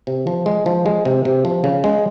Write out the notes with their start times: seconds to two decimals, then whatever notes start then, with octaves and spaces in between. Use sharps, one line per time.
0.07 C3
0.27 F3
0.46 G#3
0.66 F3
0.86 G#3
1.05 C3
1.25 C3
1.45 F3
1.64 C#3
1.84 G#3